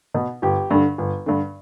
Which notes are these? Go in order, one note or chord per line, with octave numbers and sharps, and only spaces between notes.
B2
G1 G4
G2 D3
G1
G2 D3